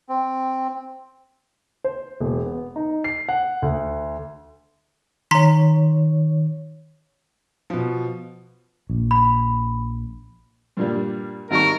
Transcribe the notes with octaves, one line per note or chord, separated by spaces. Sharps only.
C4
C5
E1
B3
D#4
C7
F#5
D2
D#3 C#5 A#5 C6 B6
B2 F3
A#1
B5
G2 A#2 G3
G#1 G3 A#4 C#6